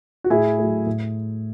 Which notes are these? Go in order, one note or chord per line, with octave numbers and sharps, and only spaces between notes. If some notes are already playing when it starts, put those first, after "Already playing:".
F#4
A2 E4 G#4
F#3 A3
A2